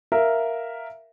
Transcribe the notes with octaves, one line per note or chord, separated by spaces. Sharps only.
A#4 E5 F5